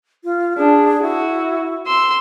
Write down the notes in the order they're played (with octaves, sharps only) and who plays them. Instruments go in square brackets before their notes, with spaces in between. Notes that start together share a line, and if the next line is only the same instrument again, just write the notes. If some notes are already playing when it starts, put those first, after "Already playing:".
[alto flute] F4
[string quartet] D4 [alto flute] G#4
[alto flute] E4 [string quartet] F#4
[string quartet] C6 E6